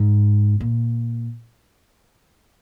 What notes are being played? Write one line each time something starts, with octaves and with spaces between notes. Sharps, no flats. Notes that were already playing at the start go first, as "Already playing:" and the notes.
Already playing: G#2
A#2